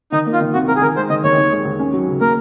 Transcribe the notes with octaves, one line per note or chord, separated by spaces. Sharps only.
D#3 D#4
A#3
F4
D#3
C2 F#4
C2 A#4
G#4
D#3 A#4
G#3 C5
D#3 D#5
D#2 C#5
D#3
G#3
D#2
C#4
F#3
C#3
A#3 A#4